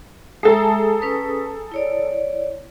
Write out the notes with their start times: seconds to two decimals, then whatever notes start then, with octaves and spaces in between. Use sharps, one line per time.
0.43 G#3 G#4 A4 E5 A5 A#5
1.01 C#4 B4 D#6
1.72 E4 C#5 D5